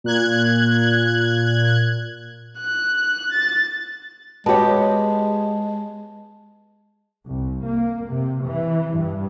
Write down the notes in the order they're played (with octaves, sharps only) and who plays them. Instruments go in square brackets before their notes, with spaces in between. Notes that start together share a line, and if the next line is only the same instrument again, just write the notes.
[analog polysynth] A#2 F#6 G#6
[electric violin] F#6
A6
[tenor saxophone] G#3 [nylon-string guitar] B3 G4 [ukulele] F#4 C#5 [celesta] A5
[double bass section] C2
A#3
C3
E3
G2